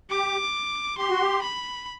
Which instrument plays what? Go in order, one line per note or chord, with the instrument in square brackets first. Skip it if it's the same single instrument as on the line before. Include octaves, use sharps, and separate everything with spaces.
[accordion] G4 [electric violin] D6
[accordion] G4 [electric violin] C6
[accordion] F#4
G4
[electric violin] B5